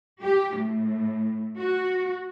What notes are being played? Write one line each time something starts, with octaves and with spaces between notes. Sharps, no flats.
G4
A2
F#4